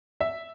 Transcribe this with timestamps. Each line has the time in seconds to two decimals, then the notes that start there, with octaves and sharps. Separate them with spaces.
0.20 E5